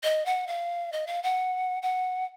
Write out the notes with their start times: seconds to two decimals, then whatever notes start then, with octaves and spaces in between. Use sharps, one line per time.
0.04 D#5
0.26 F#5
0.47 F5
0.92 D#5
1.07 F5
1.23 F#5
1.82 F#5